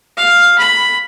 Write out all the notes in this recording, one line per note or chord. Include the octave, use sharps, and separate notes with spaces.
F5
B5